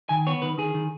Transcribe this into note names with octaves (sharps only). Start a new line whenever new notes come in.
D#3 G#5
B3 C#5
D#3 B4
D#3 G#4
D#3